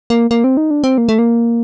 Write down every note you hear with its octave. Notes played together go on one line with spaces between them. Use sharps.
A#3
A#3
C4
D#4
D4
C4
A#3
A3
A#3